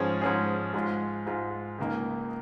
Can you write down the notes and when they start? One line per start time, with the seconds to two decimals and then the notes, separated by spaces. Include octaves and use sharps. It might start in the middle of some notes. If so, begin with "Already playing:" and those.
Already playing: G#2 F3 C#4 G#4
0.21 G#2 F3 C#4 G#4
0.74 G#2 G#3 F4
1.27 G#2 G#3 F4
1.78 C#2 C#3 A#3 D#4